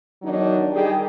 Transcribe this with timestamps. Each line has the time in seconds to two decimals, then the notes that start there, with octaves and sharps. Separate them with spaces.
0.22 E2 D#3 F#3 D4 D#4
0.73 D#3 G3 G4 G#4